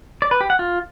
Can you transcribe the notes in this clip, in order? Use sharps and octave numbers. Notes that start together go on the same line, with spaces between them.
D5
B4
G4
F#5
F4